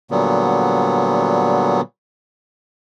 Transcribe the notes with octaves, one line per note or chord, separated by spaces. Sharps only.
A#2 D3 F#3 G3 B3